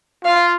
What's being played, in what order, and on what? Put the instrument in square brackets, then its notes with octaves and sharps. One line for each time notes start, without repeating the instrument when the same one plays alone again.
[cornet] F4 [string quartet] F5